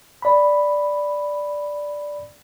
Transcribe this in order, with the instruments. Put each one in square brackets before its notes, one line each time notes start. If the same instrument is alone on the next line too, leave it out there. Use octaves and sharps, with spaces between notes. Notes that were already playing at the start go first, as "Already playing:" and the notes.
[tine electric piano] D5 B5